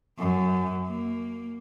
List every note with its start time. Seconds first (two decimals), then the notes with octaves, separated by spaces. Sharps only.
0.19 F#2
0.87 A#3